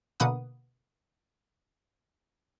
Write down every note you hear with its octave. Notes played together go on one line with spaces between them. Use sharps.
B2 D3 A#3 B4 F#5 D#6